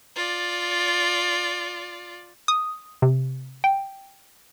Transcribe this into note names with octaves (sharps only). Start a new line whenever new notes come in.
F4 D5
D#6
C3
G5